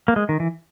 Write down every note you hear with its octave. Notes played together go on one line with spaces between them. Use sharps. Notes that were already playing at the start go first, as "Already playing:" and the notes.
A#3
G#3
D#3
E3